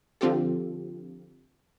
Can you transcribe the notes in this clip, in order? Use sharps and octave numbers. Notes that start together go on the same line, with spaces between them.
D3 F3 C4 F4 G4 A4